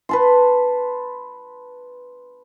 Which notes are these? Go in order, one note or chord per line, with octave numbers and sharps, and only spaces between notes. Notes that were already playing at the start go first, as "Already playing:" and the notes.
B4 A5 C6